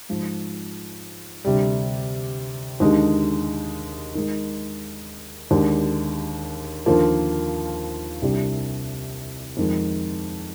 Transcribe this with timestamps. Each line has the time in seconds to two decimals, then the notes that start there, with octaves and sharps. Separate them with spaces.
0.09 G#2 F3 G#3
1.45 D2 C3 G3
2.80 D#2 D3 G#3 D#4 G4
4.15 D#3 G#3 D#4
5.51 D#2 D3 G#3 D4 G4
6.86 D#2 D3 F3 A#3 F4
8.22 C2 C3 G3 D4 G4
9.57 F2 D#3 G#3